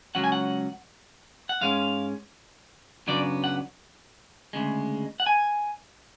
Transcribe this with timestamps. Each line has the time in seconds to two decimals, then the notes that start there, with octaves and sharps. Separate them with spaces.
0.15 C#2 C#3 F#3 C#4 F#5
0.24 G#5
0.32 F#5
1.49 F#5
1.61 G#2 G#3 C#4 F5
3.07 F#2 C#3 F#3 B3 D4 D5
3.44 F#5
4.53 D2 C#3 G#3
5.20 F#5
5.26 G#5